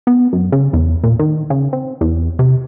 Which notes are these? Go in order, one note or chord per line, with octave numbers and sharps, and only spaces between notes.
B3
F#2
C#3
E2
A#2
D#3
C#3
C4
E2
C3